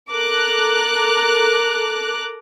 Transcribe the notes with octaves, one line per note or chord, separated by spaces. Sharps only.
A4 A#4 A#5 D6 F#6